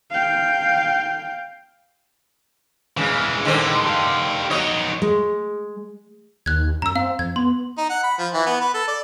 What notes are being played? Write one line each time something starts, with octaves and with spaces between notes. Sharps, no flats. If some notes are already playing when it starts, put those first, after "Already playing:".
F5 G5
C#3 E3 G#3
D3 D#3 C4
G4 F5
F#3 D#4 C#5 D#5
G#3
D#2 F#6 G#6
F#2 A#5 E6
C4 F5
F2 G#6
B3 C6
D#4
F#5
B5
F3
E3
B3
B4
A4
D5